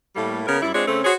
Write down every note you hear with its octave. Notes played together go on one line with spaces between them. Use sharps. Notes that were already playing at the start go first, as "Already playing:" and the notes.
A2 G3 A3 A#3
C#3 B3 A#4
F#2 G3 E4
G#3 C4 D4 F4 C#5
C#3 A3 C4 C#4
F#4 G#4 C5 C#5